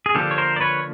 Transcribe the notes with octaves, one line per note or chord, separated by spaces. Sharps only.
G#4
D3 F3 A#3 D4 G4 A4
C#5
A#4 C5
D5
B4 C#5